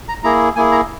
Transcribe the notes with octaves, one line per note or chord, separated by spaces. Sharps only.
A#5
A#3 E4 G#4 A#5
A#3 E4 G#4 G#5
A#5